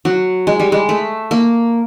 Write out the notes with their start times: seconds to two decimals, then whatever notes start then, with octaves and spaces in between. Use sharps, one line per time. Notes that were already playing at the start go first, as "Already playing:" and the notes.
0.05 F#3
0.47 G#3
0.60 G3
0.72 G#3
0.89 A3
1.31 A#3